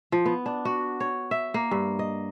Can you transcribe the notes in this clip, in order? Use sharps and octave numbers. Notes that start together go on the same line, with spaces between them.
F3
B3
D4
F#4
C#5
E5
A#3
G2
D#5